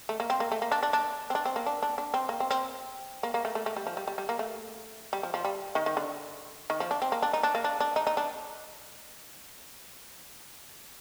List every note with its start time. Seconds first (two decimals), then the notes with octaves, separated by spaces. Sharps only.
0.09 A3
0.20 A#3
0.30 C4
0.40 A#3
0.52 A3
0.62 A#3
0.72 D4
0.83 D4
0.93 D4
1.30 C4
1.35 D4
1.45 C4
1.56 A#3
1.66 D4
1.82 D4
1.98 D4
2.14 C4
2.29 A#3
2.40 C4
2.51 C4
3.23 A#3
3.34 A#3
3.45 A3
3.55 A3
3.66 A3
3.77 G3
3.87 F3
3.97 G3
4.08 G3
4.18 G3
4.29 A#3
4.39 A3
5.13 G3
5.23 F3
5.34 F3
5.45 G3
5.75 D#3
5.86 D#3
5.97 D3
6.70 D#3
6.80 F3
6.91 D4
7.02 C4
7.12 A#3
7.22 D4
7.33 D#4
7.43 D4
7.55 A#3
7.64 D4
7.80 D4
7.96 D#4
8.07 D#4
8.17 D4